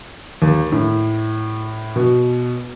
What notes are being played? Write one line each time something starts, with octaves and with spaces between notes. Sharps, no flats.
D#2
A2
B2